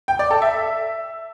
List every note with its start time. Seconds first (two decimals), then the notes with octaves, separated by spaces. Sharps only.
0.08 G5
0.19 D5
0.31 A4
0.42 E5